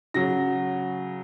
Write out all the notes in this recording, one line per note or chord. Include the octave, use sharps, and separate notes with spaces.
C#3 F#3 A#6